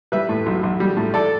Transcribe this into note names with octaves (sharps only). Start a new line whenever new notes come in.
G3 B4 E5
A2
B1
B1
G3
A2
A4 D5